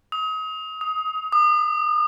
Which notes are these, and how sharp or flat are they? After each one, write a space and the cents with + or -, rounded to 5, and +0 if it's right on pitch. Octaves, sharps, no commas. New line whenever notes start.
D#6 +35
D#6 +20
D#6 -40